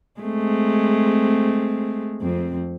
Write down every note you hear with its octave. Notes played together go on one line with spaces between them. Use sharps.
G#3 A3 C4
F2 C4